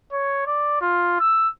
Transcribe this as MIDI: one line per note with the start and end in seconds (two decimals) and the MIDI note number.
0.12 0.45 73
0.47 0.77 74
0.81 1.16 65
1.20 1.49 88